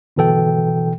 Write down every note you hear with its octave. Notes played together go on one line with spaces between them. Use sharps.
G1 B2 E3 A4 G5